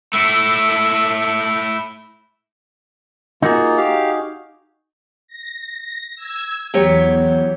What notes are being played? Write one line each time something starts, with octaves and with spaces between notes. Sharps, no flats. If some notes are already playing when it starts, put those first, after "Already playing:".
A3 E4
A#3 D#4 F4 F#4 G#4
G4 F5
A#6
E6 G#6
E2 F#3 G4 C#5